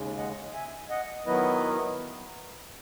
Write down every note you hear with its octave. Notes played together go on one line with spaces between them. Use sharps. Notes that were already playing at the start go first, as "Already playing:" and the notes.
Already playing: D#2 C#3 G#3
D#5 F#5
E5 G#5
D#5 F#5
D#3 F#3 B3 E4 B4 D#5